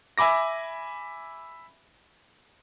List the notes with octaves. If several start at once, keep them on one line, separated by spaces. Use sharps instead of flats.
E5 G#5 B5 D6 A#6